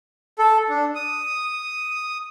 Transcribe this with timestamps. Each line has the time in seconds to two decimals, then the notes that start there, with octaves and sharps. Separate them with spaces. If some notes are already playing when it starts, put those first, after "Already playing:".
0.39 A4
0.69 D4
0.95 D#6